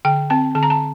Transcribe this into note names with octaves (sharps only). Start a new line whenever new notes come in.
D3 G5
C4 A5
D3 A5
A#5
A5